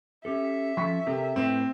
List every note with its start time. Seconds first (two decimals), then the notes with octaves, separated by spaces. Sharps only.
0.25 C#4 G4 A4 E5
0.77 F3 C#4 A4 C#6 B6
1.07 C3 A4 A#4
1.36 A2 C4 B4 C5